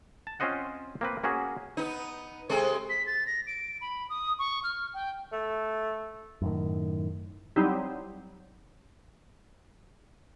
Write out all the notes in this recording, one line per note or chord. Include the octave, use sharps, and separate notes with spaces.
A5
C4 C#4 F4 C5 D#5 F#5
A#3 C4 B4
A#3 C#4 F#4 G#4
B3 D#4
C3 G#3 A4
B6
A6
A#6
D7
B5
D#6
C#6
F6
G5
A3
F#2 A2 D#3
F#3 G3 C4 D#4 E4 G4